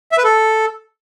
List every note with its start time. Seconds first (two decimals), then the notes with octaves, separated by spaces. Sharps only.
0.12 E5
0.18 B4
0.24 A4